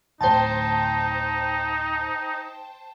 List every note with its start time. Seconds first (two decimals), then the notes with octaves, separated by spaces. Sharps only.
0.21 D1 A2 D#4 C5 G5 A5